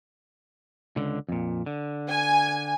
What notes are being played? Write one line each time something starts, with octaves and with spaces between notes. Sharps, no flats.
C#2 D3
F2 A#2
D3
G#5